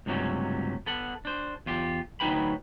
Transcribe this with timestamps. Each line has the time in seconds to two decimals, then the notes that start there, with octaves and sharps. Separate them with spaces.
0.06 C#2 G2 C3 F#3 A3 C#4
0.86 B3 A4 F#5
1.25 D4 C5
1.66 E2 F4 G4
2.20 D2 F#3 D#4 B4 G5 B5